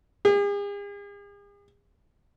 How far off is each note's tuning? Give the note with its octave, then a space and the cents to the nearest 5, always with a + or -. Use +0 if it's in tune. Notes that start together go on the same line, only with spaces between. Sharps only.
G#4 -45